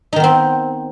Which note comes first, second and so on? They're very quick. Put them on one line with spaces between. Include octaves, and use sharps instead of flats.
D#4 D#3 B3 C4